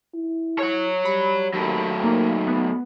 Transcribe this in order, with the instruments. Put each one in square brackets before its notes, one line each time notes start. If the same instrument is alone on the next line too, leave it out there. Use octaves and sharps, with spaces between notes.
[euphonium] E4
[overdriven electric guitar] C#5 F#5
[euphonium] G3 [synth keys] B5
[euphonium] D#2 [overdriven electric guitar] F#3 A3
[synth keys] A#3 A#4 [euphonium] D#4
[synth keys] B3